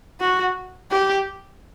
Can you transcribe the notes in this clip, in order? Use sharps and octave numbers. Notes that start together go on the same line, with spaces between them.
F#4
G4